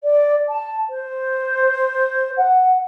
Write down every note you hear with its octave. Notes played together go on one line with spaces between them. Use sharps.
D5
A5
C5
F#5